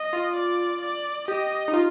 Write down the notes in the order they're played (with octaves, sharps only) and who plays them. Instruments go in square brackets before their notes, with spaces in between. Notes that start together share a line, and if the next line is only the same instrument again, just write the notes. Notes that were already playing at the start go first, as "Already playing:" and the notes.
Already playing: [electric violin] D#5
[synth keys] F4
[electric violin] D5
D5
[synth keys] G4 [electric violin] D#5
[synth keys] D#4
F4